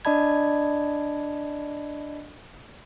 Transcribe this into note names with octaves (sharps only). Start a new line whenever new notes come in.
D4 D5 D#5 A5 B5 G#6